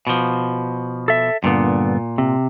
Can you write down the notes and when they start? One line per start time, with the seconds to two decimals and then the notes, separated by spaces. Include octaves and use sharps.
0.07 B2 F3
1.08 A4 E5
1.44 G2 A#2 D3 B3
2.18 C3